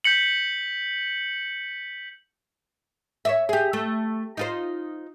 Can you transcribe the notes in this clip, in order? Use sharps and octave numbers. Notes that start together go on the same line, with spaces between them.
G6 B6 C#7 F#7
C#5 D#5 E5
G4 G#4
A3
D#4 F4 C5